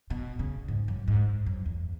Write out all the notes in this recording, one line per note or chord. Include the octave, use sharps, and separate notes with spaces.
B2
C#3
G#2
F#2
G#2
F#2
E2